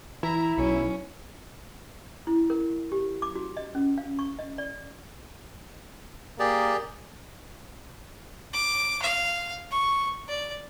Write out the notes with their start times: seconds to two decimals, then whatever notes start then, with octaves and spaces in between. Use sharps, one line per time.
0.23 E3 E4 A#5
0.58 B1 B2 C#4
2.27 E4
2.50 A#4
2.92 G4
3.22 D6
3.36 F#4
3.57 D#5
3.75 C#4
3.98 F5
4.19 C#6
4.39 D#5
4.58 D5
6.39 A#3 G4 G#4 D5
8.53 D6
9.02 F5
9.71 C#6
10.28 D5